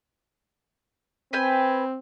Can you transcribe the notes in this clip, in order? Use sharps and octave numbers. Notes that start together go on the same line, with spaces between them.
C4 B4 G5 G#5